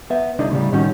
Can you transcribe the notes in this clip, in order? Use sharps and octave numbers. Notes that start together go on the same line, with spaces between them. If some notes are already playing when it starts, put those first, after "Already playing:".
B3 E5
C2 D3 D4 E4 D#5
A2 C#3 G3
A2 D#3 G3 C#4 F#4